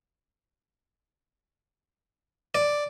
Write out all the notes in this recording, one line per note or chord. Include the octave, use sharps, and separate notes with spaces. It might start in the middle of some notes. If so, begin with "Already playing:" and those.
D5